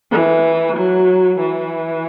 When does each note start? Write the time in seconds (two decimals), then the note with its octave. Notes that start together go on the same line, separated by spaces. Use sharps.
0.12 E3
0.76 F#3
1.40 E3